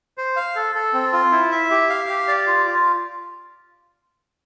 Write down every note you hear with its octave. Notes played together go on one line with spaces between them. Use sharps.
C5
F5
A4
A4
C4
F4
E4
E5
G4
F5
G4
D5
F4
F4